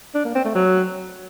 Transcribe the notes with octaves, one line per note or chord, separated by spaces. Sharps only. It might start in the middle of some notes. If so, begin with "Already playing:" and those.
D4
A#3
C4
A3
F#3